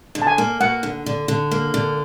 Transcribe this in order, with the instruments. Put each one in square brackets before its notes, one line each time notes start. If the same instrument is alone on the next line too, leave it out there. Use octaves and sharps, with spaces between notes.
[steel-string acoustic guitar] D3
[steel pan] A5
G#5
[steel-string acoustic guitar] A#3
[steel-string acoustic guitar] A#3 [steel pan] F#5
[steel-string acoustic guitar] D3
D3
D3
A#3
D3